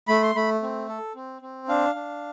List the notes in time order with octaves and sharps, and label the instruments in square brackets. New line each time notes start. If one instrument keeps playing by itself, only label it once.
[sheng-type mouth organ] A3 B5
C6
A3 B5
C4
A4
C4
C4
D4 F5
D4